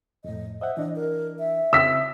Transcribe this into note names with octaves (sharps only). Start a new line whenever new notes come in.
F2 A2 D#5
C5 D#5 E5 F#5
E3 D4 D#5
A#4
E5
C#3 C4 E6 B6